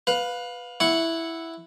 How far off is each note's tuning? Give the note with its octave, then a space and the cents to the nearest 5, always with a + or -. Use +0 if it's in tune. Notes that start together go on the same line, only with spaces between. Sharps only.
B4 +0 F5 +25
E4 +0 F#5 +0 C#6 +0